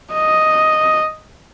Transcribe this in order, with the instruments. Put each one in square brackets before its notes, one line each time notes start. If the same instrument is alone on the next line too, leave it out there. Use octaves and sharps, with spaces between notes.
[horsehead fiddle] D#5